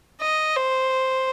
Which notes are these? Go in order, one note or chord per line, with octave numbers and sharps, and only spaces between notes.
D#5
C5